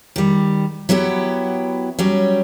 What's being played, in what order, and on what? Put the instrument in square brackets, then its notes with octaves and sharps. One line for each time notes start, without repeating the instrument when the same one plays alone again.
[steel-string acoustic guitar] D#3 G3
F#3 B3 E4 G4
F#3 G3 C#4